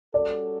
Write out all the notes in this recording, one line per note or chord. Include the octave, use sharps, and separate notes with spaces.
G3 C#4 F#4 A4 D5